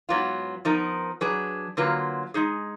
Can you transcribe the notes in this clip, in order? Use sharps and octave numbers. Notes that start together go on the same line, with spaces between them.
G#2 F#3 B3 F4
F3 B3 D#4 A#4
F#3 D4 G#4 B4
D3 F#3 A#3 F4 B4
G#3 D#4 G#4